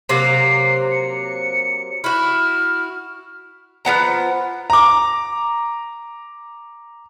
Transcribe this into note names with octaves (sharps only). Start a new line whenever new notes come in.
C3 F#3 A#3 C7
C#7
E4 F#4 F6
F3 B3 F#5 A#5
A#5 D6